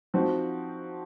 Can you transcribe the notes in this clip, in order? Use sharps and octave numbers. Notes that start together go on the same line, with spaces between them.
F3 C4 D#4 F#4